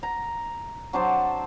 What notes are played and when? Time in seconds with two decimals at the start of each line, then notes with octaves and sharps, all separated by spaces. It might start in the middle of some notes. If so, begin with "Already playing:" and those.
0.03 A#5
0.93 F#3 D4 C5 A5